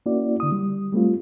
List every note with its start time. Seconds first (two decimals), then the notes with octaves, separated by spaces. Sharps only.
0.06 A#3 C#4 E4 F#4 D5
0.40 D3 D#6
0.52 G3
0.93 G3 A3 C4 F4